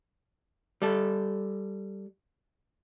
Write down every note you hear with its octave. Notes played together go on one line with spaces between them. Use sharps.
G3 A4